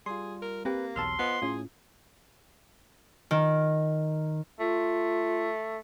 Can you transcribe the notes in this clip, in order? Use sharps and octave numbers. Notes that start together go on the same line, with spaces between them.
G3 F4 G#4 C6
A#4
A#3 C4 G4 B4
B1 E2 F#3 A5 C6 E6 F6
B3 F4 C5 D#5
A2 C#4 F4 G#4
D#3
A3 F4